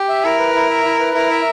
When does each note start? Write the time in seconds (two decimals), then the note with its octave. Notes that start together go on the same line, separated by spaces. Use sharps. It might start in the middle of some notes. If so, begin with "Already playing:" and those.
Already playing: G4
0.09 E5
0.25 E4 A#4
0.39 B4
0.54 E4
0.70 E5
0.84 E4
1.00 B4
1.15 E4 A#4
1.30 E5